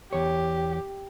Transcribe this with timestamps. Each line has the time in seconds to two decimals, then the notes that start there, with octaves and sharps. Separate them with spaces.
0.13 E2 G4 C#5